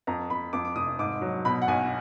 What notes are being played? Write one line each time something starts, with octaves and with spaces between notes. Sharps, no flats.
F2 A#5
F2 B5
F2 D6
D6
F1 D#6
G#2 D6
F#3
B2 B5
F#5
B1 G#5